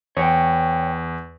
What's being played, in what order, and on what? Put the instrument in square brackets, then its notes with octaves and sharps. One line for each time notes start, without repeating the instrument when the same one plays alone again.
[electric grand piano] E2 [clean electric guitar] C#5 G5